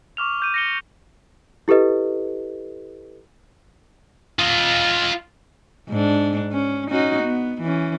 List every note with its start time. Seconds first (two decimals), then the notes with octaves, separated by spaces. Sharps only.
0.17 C#6 D6 F6 F7
0.40 D6 G6 D#7
0.54 A#6 C#7 G7
1.68 E4 G4 A4 B4 D#5
4.39 F4 D#5
5.89 G#2 D4
6.52 C#4
6.91 C#4 D#4 F#4
7.23 B3
7.62 E3 C#4